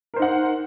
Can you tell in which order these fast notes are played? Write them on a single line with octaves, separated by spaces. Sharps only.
A#4 C5 D#4 F#5